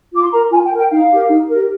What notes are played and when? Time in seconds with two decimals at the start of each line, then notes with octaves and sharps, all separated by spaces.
0.13 F4 D6
0.22 C6
0.32 A#4 A#5
0.51 F4 G#5
0.64 G5
0.71 A#4
0.77 G5
0.90 D#4 F5
1.09 G4 A#4
1.29 D#4
1.49 G4 A#4